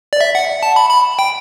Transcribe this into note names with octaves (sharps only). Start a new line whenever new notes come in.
D5
E5
F#5
A5
B5
B5
G5